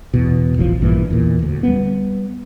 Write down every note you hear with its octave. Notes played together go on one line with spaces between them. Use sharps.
E2 B2
E1 A1 E3 F3
A#1 G2 A#2 E3
E2 A#2
D2
G3 B3